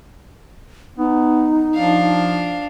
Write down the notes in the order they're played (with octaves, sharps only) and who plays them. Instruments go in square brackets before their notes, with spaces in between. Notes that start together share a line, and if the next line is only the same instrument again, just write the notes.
[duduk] B3 [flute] D#4
[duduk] F3 [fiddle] D4 F5